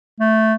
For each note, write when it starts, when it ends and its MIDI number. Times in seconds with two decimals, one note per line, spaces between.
0.20 0.54 57